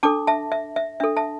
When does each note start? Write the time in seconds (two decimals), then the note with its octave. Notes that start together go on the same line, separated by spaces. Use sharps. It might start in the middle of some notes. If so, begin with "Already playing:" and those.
0.03 D4 A4 A5 D6
0.27 E5 A5
0.52 E5
0.76 E5
1.00 D4 A4 E5
1.17 E5 A5